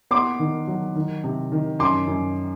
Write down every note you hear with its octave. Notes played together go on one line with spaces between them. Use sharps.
B3 C6 D6
D#3
F#3
D#3
C3
D#3
F#2 C6 D6
F#2